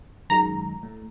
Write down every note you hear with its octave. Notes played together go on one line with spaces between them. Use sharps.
F#2 D#3 G#3 A#5
A2